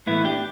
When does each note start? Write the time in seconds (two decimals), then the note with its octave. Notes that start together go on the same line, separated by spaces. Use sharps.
0.06 A2 E3 A3 B3 E4
0.24 D4 G4